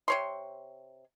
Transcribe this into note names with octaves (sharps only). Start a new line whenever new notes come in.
C3 C#5 C6